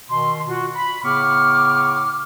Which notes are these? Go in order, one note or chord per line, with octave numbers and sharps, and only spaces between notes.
B2 D#3 C6
F4 F#4
B5
A2 C#3 B3 C#6 D6 F6